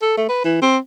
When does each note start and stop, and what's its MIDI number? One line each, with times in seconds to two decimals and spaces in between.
0.02 0.16 69
0.17 0.27 57
0.29 0.42 71
0.45 0.61 52
0.62 0.78 60